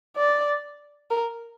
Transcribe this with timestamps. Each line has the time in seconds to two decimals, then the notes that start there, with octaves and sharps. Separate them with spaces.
0.17 D5
1.10 A#4